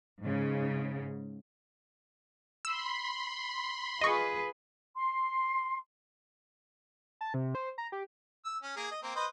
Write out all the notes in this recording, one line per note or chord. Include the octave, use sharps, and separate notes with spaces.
G#2 C#3
B5 C6 E6
F4 G#4 B4 D#5 C#6
C6
A5
C3
C5
A#5
G4
E6
C#4
A#3 G#4
D#5
A#3 C4
B4 C5 D#5